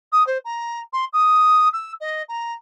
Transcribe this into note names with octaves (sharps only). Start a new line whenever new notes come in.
D#6
C5
A#5
C6
D#6
E6
D#5
A#5